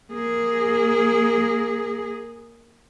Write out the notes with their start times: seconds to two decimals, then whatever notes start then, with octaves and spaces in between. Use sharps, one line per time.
0.13 A#3 G#4